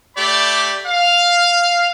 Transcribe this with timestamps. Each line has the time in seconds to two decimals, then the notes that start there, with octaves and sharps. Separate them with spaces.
0.16 A3 G4 D5 B5
0.85 F5